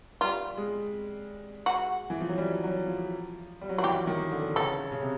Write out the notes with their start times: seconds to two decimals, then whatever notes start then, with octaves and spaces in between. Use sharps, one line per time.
0.21 G3 F4
0.57 G#3
1.66 F#4
2.10 E3
2.20 F3
2.29 F#3
2.38 G3
2.63 F#3
2.86 F3
3.61 G3
3.69 F#3
3.77 F3 F#4
3.84 E3 G4
4.07 D#3
4.31 D3
4.56 C#3 A4
4.92 C#3
5.02 C3